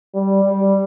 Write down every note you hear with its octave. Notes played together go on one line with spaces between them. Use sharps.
G3
G3